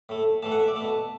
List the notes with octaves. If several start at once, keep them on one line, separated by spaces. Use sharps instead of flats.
A2 A3
A2 E3 A3 A5
F#5
E5
D5
B2 A3 A5